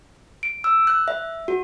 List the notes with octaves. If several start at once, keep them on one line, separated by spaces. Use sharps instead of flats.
D7
E6
F#6
E5
F#4